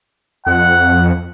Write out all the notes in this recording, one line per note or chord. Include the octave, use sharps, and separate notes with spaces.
F2 F#5